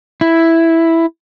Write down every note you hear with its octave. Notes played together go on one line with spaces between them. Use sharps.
E4